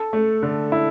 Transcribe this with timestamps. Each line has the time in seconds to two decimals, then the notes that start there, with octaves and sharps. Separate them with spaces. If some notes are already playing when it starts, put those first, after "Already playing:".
Already playing: A4
0.13 A3
0.43 D3
0.72 E4